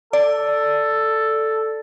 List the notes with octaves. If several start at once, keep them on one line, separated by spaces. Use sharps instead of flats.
A4 D5